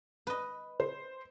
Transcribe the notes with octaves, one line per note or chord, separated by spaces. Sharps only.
B4 D#5
C5